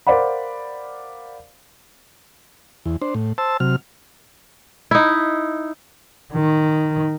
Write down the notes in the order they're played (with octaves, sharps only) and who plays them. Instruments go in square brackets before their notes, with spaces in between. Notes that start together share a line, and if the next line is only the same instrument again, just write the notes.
[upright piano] A#4 C5 D5 F5 F#5 B5
[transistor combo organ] E2
D4 C5
A2
C5 A5 E6
C3 F#3 F6
[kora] D#4 E4
[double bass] D#3